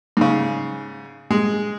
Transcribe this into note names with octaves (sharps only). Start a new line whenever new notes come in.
G#2 C#3
G#3